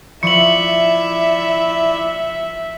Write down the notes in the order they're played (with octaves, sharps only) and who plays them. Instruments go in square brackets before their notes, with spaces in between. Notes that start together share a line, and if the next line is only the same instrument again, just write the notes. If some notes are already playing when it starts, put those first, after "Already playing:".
[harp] F3 C#6 [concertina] E4 D5 [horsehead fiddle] E5 [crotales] C#7 F#7